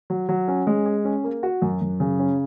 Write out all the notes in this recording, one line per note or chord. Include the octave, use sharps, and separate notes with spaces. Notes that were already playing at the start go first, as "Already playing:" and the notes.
F#3
F#3
C#4
G#3
G#4
C#4
A#3
F#4
F#2
F#2
C#3
C#4